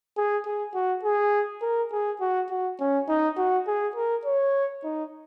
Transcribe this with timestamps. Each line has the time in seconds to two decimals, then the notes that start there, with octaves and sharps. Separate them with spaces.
0.17 G#4
0.45 G#4
0.75 F#4
1.03 G#4
1.62 A#4
1.92 G#4
2.21 F#4
2.50 F#4
2.79 C#4
3.09 D#4
3.37 F#4
3.67 G#4
3.96 A#4
4.25 C#5
4.84 D#4